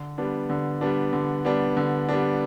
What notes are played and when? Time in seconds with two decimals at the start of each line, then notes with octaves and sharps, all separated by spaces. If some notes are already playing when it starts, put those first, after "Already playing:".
Already playing: D3
0.18 G3 B3 D4
0.50 D3
0.81 G3 B3 D4
1.13 D3
1.45 G3 B3 D4
1.77 D3
2.09 G3 B3 D4